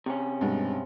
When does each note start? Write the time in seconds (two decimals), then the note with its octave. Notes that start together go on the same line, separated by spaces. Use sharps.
0.06 C3 C#4
0.41 G2 B2 G#3